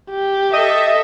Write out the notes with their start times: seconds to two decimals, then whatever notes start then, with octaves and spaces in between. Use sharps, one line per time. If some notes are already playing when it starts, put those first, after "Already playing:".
0.11 G4
0.53 A4 D#5 E5